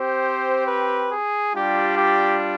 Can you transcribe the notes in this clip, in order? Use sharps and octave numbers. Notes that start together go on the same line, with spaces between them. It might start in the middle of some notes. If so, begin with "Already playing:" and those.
Already playing: C4 G4 C5
B4
G#4
G3 D4 F4 G4
G4